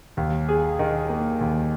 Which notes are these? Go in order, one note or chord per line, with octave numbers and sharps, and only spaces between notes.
D#2
G#4
D#3
A#3
D#2